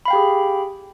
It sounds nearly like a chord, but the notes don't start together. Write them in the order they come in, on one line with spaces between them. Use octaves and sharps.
B5 F5 G5 G4 G#4